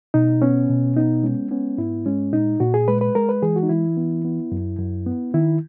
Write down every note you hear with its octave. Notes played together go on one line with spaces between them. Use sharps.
B2 D#4
B3 C#4
B2
B3 D#4
G#3 C#4
B3 C#4
G#2 E4
G#3 C#4
A#2 D#4
A#2 F#4
G#4
G#3 B4
B4
G#3 A#4
B4
E3 G#4
F#4
D#4
E3 E4
B3
B3
F#2
F#2
B3
D#3 E4